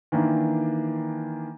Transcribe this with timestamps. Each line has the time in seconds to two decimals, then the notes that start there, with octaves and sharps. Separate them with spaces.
0.12 D#3 E3 A#3 D4